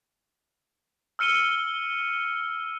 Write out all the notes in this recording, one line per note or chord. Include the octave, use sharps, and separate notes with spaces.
E6 F6 C#7 D#7 G7